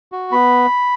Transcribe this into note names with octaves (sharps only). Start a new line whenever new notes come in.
F#4
B3 B5